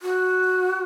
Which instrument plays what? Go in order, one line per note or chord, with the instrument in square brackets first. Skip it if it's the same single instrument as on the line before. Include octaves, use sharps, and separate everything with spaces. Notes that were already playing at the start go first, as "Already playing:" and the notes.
[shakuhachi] F#4